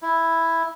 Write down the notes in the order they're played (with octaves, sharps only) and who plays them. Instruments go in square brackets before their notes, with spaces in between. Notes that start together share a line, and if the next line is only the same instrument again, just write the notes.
[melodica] E4